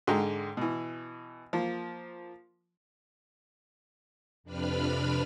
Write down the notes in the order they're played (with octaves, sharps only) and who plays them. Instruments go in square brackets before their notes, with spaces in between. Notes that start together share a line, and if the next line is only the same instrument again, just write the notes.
[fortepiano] G#2 D3 G#3 G5 A#5
B2 E3
F3 A#3
[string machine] F2 C3 D4 B4 B5 F6